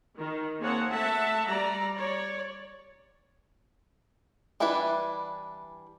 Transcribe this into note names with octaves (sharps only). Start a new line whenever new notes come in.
D#3
A#3 C4 G#4 C#5 F#5 A5
A3 E5 F#5 A5
G3 D5 A#5
C#5 D5
E3 G3 D4 E4 B4